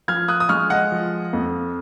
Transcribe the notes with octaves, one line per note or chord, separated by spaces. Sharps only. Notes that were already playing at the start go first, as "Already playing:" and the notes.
F3 F6 G#6
D#6 F#6
D#6
G#3 C#6 F6
D#5 F#5
F3
F2